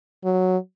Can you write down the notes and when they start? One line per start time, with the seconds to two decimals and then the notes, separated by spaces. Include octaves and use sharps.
0.24 F#3